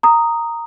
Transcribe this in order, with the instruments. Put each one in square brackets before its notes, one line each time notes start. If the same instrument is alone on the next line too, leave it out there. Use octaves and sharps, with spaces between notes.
[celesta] A#5 D#6